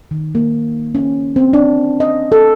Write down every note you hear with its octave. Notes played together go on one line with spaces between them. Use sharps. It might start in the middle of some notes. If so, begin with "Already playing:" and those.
D#3
A#3
C#4
C4
D4
D#5
A4